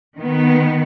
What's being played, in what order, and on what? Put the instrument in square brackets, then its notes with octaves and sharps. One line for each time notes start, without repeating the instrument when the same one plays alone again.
[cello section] D#3 B3